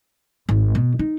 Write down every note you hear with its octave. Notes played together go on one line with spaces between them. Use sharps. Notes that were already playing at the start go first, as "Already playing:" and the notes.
G#1
B2
D#4